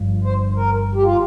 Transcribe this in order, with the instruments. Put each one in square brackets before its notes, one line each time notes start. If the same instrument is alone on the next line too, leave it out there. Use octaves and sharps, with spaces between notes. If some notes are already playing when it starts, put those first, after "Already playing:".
Already playing: [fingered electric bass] G1 G2 F3
[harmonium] C5
A#4
G4
F4